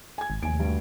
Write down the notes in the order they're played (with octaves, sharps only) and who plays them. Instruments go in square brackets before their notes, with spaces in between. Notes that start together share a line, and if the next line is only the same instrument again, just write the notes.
[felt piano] G#5 G#6
[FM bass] G#1
[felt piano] F1 G#5 D7 [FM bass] D#2
[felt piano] D2 G2